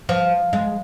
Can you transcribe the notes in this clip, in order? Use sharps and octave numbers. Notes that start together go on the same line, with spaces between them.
F3
G#3